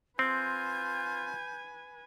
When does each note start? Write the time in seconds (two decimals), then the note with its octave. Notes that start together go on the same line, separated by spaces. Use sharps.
0.19 C4 F4 B4 G#5 G6